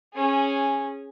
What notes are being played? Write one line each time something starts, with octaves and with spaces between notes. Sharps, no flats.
C#4 G#4